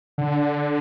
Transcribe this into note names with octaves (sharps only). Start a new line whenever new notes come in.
D3